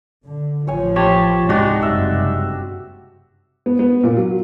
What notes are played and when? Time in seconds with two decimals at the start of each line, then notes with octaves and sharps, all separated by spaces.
0.23 D3
0.67 A1 F3 C#5 G#5
0.96 G4 C#5 A5 C6
1.49 C#2 G#2 C3 G#3 D4 D#4 F#4 G4
1.82 F#1 G2 C3 E5
3.66 B3
3.79 B3
4.03 A#2
4.17 F#3